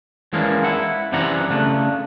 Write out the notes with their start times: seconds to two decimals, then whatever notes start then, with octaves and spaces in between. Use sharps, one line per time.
0.33 E3 G#3 A#3 C#4 D4
0.64 E4 F#5
1.12 F#2 C3 E3 D4 F#5 A#5
1.50 C#3 A3 D4